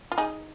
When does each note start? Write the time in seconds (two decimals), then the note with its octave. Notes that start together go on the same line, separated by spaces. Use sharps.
0.12 F4
0.18 D#4 G#4